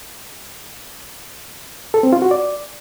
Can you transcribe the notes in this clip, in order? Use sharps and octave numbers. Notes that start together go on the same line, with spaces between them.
A4
C4
F4
F#4
D5